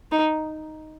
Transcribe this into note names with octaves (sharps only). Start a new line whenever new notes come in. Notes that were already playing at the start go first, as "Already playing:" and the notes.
D#4